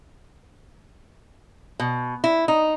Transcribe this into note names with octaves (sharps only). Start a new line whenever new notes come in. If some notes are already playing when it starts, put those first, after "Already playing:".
B2
E4
D#4